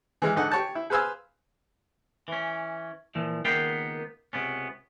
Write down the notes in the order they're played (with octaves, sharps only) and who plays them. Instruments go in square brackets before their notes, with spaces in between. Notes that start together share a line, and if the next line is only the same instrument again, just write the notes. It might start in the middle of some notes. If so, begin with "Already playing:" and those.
[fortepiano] E3 G#3 F5
G#2 D3 A4 D#5 F#5
G4 C#5 A5
E4
G#4 B4 C5 F5 G#5 E6
[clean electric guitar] E3 C#4
A#2 E3 F3
C#2 D#3 A#3 B3 F5 G5
C#2 C3 B3 C#4